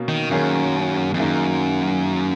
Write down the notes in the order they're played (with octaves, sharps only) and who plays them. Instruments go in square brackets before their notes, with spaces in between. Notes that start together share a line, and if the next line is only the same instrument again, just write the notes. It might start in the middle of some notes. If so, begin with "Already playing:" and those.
Already playing: [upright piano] B2 A#3 C#4
[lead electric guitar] D#3
[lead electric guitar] F#2 [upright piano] D#3 A#3 C#4 G#4
[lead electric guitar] F2
[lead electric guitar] F#2 [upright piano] D#3 A#3 D#4 G#4